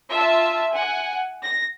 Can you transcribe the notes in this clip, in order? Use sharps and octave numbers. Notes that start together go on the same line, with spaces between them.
F4 E5 A5 E6
F#5 G#5
A#6